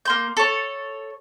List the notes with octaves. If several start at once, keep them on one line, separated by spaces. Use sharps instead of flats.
A#3 C6 G6
A4 C#5